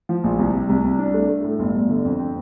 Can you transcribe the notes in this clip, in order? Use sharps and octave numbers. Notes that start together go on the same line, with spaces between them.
F3
A#1
C2
C3
C2
C2
D4
A3
A3
A2
G1
G1
D3
F2
C4